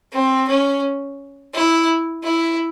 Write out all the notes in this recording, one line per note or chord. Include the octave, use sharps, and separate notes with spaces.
C4
C#4
E4
E4